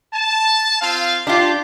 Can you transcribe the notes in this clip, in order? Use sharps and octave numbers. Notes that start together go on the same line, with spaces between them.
A5
C4 F4 F5
D4 F4 G4